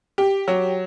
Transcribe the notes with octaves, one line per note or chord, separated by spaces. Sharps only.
G4
F#3